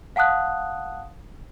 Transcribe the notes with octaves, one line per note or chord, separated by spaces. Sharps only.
F5 F#5 A5 D#6 F#6